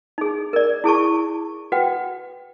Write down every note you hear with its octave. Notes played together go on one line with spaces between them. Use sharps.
D#4 G#4
A#4 D5
E4 G#4 A5 C#6
F#4 B4 F#5 G5